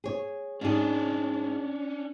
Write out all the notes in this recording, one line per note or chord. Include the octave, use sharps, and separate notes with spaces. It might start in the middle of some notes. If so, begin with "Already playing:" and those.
G#4 C#5
G#2 C#4 D4 G#4